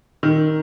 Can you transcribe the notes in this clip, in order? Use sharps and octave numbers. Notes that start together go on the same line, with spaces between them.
D#3